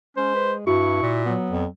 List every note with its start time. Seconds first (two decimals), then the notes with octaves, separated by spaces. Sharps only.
0.17 G#3 C#4 C5
0.35 B4
0.67 G2 E4 F#4 C#6
1.02 A#2
1.26 F#3 B3
1.51 F2